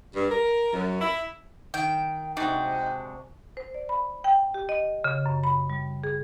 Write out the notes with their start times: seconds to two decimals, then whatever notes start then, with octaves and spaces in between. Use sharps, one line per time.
0.15 G2
0.31 A#4
0.73 F#2
1.01 E4
1.74 D#3 G5
2.37 C3 G#3 D4 D#4 F#4 G5
3.57 C5
3.74 D5
3.89 B5
4.24 G5
4.54 G4
4.69 D#5
5.04 C#3
5.26 F#2
5.44 B5
5.70 G3
6.04 G#4